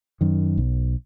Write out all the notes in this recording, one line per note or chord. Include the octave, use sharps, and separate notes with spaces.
F#2 D#3
B1